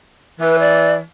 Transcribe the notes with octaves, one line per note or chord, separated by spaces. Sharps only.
E3 B4
D5